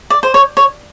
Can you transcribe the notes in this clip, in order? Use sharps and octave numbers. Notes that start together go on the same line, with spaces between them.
D5
C5
C#5
C#5